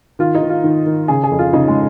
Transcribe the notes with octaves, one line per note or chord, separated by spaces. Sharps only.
D#3 F4
D#4
D#3
F4
D#3
D#3
C#3 G#4
G#4
F2
F4
C#3 D#4
G#3